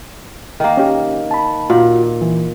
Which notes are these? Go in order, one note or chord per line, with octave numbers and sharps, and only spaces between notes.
D#3 A#3
C#4 G4
A5 B5
A#2 F4 F#4
E3